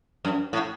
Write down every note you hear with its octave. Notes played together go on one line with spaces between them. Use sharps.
F#2
A2